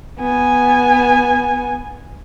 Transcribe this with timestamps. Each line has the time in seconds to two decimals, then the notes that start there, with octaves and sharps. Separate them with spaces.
0.20 B3 G#5